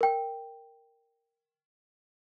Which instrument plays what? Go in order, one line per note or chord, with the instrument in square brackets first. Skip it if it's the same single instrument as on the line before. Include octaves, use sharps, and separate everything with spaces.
[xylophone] A#4 G5